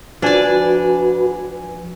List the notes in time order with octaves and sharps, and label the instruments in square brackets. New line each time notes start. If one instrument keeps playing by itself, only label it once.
[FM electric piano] F3 G#5 [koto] D4 D5 [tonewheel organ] F#4 B4